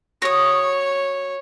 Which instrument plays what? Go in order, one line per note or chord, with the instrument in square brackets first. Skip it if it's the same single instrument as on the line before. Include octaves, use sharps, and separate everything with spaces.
[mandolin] F#4 D#6 [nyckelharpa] C#5